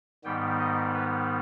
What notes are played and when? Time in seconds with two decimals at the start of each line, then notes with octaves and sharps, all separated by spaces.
0.24 G#2 D#3 G3 B3 G5
0.59 D#5
0.94 B4